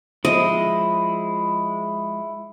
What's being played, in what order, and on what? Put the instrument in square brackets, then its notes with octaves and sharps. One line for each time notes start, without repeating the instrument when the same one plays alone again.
[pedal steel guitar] F3 G#3 [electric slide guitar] E4 [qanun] D#5